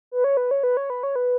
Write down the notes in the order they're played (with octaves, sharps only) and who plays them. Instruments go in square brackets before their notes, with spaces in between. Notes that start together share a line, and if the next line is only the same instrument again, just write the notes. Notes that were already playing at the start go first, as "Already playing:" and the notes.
[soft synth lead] B4
C#5
B4
C#5
B4
C#5
B4
C#5
B4